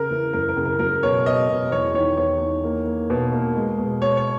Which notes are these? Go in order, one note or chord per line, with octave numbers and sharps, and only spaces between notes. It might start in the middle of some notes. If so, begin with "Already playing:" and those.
Already playing: C#3 A#4
E3
F#2 A#4
A#4
C#3
A#4
F#3 A#4
B2 C#5
B2 D#5
B2
E2 C#5
D#3 C#5
E2 C#5
D#3
A#3
A#3
B2
A#3
G#3
B2
B2 C#5
C#5